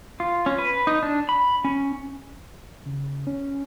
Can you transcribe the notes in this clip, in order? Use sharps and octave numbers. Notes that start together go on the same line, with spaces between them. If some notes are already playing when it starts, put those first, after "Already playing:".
F4
C#4
B4
D#4
D4
B5
C#4
C#3
C#4